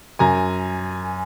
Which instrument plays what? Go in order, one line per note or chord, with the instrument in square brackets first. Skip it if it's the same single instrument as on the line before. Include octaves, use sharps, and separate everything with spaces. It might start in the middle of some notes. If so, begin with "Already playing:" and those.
[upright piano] F#2 G#5 A#5